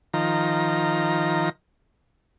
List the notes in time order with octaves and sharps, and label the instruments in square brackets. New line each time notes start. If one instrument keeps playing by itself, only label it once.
[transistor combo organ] D#3 F3 A#5